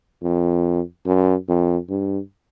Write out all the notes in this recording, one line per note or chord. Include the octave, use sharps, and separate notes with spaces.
F2
F#2
F2
G2